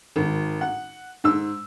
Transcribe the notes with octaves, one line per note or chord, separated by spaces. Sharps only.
G#1
F#5
G#2 E6